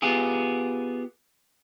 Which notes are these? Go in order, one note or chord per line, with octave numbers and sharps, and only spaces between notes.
B3 F4 G4 G#4